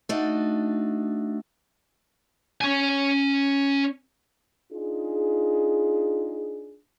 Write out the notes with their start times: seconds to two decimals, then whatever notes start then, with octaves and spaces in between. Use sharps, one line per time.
0.09 A3 D4 D#4 F#4
2.61 C#4 G#5
4.73 D4 D#4 F4 G#4